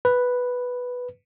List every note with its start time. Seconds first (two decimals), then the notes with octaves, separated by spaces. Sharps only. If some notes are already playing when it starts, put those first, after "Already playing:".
0.05 B4